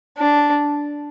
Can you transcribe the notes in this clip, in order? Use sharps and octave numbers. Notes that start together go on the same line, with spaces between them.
D4